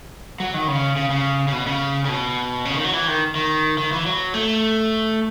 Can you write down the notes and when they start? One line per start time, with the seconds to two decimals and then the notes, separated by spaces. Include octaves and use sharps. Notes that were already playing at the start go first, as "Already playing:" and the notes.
0.40 F#3
0.54 D#3
0.68 C#3
0.96 C#3
1.10 C#3
1.48 C#3
1.52 B2
1.67 C#3
2.05 C#3
2.09 B2
2.65 C#3
2.75 D#3
2.84 F#3
2.93 E3
3.08 D#3
3.36 D#3
3.78 D#3
3.92 E3
4.06 F#3
4.34 A3